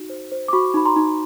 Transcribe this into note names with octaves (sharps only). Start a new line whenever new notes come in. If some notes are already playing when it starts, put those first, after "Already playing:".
Already playing: D#4 F#4
C5
C5
D6
F#4 B5 C#6
D#4 B5
A#5 C6
D#4